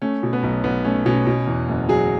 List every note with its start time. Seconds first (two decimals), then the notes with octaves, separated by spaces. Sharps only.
0.02 A3 C#4
0.23 B2
0.33 B3
0.43 B1
0.64 B1 B3
0.85 A3 C#4
1.06 B2 C#4
1.26 B2
1.47 E2
1.68 F#1
1.89 F#3 G#4